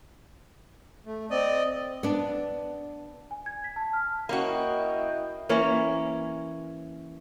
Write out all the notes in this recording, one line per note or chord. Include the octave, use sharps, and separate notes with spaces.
A3
C4 D5 D#5 D#6
B3 D4
G#5
G#6
B6
A5
F6
A#3 C#4 E4 F#4 D#5 G5
E3 A#3 C#4 C#5